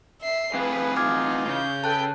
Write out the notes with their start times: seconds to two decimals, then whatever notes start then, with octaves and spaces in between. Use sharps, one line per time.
0.22 E5 C7
0.54 A2 C4 G#4 B4 F5
0.97 E3 D#4 F4 D6 F6 G#6
1.47 C#3 G6
1.84 A4 B4 G5 A5 F#6